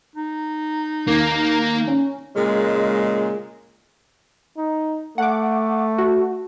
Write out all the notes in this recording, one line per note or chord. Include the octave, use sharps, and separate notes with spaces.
D#4
D#2 A#3
C#4
A#2 C#3 G#3
D#4
A3 F#5 D6
F#4